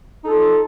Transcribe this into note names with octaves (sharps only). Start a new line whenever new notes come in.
D#4 F4 A4